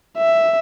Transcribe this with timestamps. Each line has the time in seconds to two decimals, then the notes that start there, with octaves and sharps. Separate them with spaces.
0.17 E5